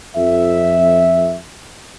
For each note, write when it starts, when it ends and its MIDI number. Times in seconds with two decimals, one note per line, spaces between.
0.16 1.36 41
0.16 1.36 76